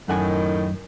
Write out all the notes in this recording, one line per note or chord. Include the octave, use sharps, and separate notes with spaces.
F#2 A2 D#3 F#5 G#5